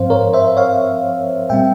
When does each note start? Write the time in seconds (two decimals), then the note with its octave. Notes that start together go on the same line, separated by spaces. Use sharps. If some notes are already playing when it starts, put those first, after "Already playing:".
Already playing: G#2 F3 C4 C5 F5
0.10 A#4 C#5
0.33 C5 E5
0.57 C#5 F5
1.49 A#2 G3 C4 E5 G5